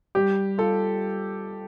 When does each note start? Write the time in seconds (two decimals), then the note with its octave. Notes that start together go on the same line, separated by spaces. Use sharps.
0.15 G3 G4
0.58 F4 A4